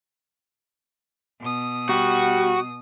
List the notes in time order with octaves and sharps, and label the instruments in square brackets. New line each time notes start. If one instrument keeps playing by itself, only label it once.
[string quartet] B2 D#6
[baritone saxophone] G3 [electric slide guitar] F#4